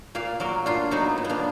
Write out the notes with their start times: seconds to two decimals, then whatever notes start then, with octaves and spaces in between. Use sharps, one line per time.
0.15 A#2 D5 F5
0.40 F#3 A#4 D5
0.66 A#2 D4 F4
0.91 F#3 B3 D#4
1.18 A#2
1.24 B3
1.29 A#3 D4